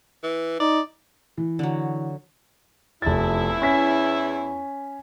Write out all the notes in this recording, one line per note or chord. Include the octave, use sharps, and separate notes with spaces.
E3
D#4 D5
E3
D3 F#3
F1 E2 E4 A6
C#4 G#5 B6